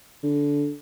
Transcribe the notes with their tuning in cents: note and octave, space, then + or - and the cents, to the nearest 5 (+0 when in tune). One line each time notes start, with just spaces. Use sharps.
D3 -20